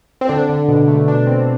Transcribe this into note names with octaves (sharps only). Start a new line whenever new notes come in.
C4
D3 D4
D3
B2
A3
B2 D4
C4